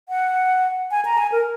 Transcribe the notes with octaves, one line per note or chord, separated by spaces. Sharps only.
F#5
G#5
A#5
G#5
A#4